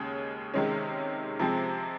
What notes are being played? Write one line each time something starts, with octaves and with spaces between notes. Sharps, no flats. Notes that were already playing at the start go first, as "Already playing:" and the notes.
Already playing: D#2 C#3 G#3 C#4 G#4
C3 D#3 G#3 C#4
C3 F3 G#3 C4